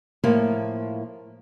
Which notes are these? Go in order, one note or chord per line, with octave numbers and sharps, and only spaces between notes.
A2 F3 A3 A#3